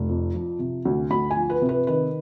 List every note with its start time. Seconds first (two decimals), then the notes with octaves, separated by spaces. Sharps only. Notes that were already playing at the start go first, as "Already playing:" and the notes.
Already playing: F1
0.09 F2
0.35 F3
0.59 C3
0.85 D2
1.11 D2 B5
1.31 G#5
1.36 F3
1.50 B4
1.62 C3
1.69 B4
1.87 D#3 B4